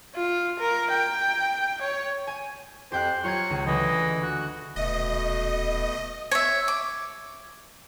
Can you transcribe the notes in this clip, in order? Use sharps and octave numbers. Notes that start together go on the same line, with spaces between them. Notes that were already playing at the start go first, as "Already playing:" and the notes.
F4
A#4
G5
C#5
G#5
F2 G4 C5 G5 F#6
F#3 F4 C#6 G#6
C#2
D2 E3 D#5
F#4
D#1 B2 A3 D#5
C#5 E5
D6